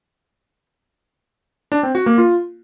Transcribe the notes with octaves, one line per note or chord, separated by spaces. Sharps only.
D4
C4
F#4
A#3
F4